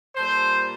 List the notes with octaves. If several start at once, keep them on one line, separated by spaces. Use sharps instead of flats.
A#2 G3 A4 C5